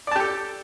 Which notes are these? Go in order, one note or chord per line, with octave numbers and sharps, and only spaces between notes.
G4 A4 D5 A5